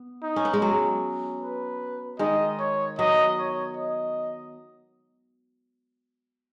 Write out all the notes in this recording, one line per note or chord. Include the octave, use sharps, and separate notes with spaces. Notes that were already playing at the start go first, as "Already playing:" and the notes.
Already playing: B3
D#4
C#4
B3
G#3
F#3
B4
D#3 G#3 D#5
C#5
F#3 B3 D#5
C#5
D#5